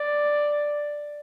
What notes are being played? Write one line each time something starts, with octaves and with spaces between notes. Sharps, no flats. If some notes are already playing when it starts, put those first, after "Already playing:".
Already playing: D5